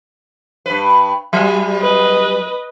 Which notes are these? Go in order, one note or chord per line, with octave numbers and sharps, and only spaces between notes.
G2 B4
F#3 G3
B4 D#5